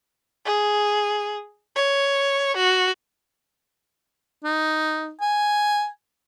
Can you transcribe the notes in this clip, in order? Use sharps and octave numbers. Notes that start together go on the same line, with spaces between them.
G#4
C#5
F#4
D#4
G#5